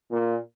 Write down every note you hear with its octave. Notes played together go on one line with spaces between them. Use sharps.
A#2